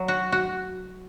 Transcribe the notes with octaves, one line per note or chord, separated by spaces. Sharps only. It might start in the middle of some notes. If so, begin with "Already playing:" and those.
Already playing: F#3
F#4
F#4